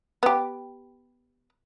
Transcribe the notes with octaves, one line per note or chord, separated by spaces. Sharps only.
B3 G4